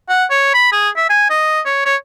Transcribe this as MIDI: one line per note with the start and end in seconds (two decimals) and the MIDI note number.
0.09 0.25 78
0.30 0.52 73
0.54 0.70 83
0.72 0.89 68
0.96 1.08 76
1.10 1.28 80
1.30 1.60 75
1.65 1.81 73
1.86 1.96 73